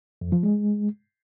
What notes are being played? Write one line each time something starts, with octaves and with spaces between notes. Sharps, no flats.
F2
F3
G#3